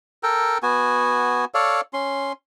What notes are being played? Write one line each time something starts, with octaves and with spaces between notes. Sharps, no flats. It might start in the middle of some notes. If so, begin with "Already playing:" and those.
A4 A#4 G5
B3 F#4 G#5
A4 C#5 D5 F5
C#4 C6